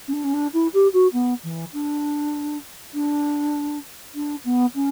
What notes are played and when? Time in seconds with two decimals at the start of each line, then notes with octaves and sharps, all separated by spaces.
0.08 C#4
0.13 D4
0.24 C#4
0.34 D4
0.54 E4
0.74 G4
0.94 F#4
1.13 B3
1.44 E3
1.74 D4
2.95 D4
4.15 D4
4.45 B3
4.75 C#4